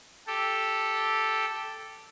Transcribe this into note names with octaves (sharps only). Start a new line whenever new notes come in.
G4 A4